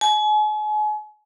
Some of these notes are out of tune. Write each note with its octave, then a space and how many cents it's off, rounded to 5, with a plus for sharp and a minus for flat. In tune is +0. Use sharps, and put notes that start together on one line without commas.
G#5 +40